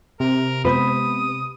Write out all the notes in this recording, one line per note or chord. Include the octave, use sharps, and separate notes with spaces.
C3 A#4
G#3 B3 B4 C5 D#6